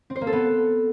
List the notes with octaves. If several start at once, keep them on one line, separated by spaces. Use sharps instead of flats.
C4
C5
A#3
A4
B3